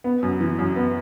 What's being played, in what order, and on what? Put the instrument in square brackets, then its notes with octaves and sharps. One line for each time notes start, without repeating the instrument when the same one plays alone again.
[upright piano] B3
F#2
E3
F#2
B3